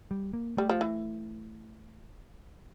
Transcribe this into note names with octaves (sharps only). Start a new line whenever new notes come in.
G3
A#3
G3 A3
F3
E3